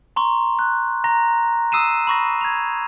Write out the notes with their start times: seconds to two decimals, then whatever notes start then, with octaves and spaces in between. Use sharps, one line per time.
0.16 A#5 C6 C#6
0.59 F#6
1.04 A#5 A#6
1.72 D#6 E6 C7 D#7 E7
2.07 B5 C#6 A#6
2.41 G#6 F7